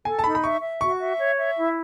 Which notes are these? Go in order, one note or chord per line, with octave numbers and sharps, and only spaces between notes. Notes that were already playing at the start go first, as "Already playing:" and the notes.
A4 G#5
A5
D#4 B5
B5
E5 C#6
E5
F#4 C#6
E5
C#5
E5
E4